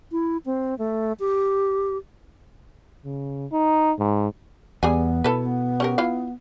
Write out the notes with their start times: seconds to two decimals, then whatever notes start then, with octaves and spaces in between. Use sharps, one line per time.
0.12 E4
0.46 C4
0.78 A3
1.20 G4
3.05 C#3
3.52 D#4
3.99 G#2
4.83 E2 G3 B3 G#4 G#5
5.24 B2 E4 A4 B4
5.42 B3
5.80 C#4 G4 A#4
5.98 E4 F4 F5